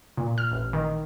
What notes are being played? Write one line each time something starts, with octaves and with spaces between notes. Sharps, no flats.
A#2
F6
A1
D#3